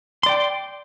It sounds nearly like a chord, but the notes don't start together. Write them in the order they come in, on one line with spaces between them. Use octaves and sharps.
C6 D5 G5